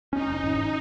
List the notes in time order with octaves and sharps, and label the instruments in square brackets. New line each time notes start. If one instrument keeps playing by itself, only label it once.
[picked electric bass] C#4 [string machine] D#4
[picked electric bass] F1
G#1